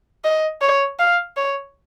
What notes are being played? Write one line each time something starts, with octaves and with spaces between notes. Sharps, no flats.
D#5
C#5
F5
C#5